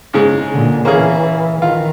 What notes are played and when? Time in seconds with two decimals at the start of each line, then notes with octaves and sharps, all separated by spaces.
0.13 G#2 C#3 G#3
0.52 A#2 D3
0.85 E3 A#3 C#4 G#4
1.62 D#3 F4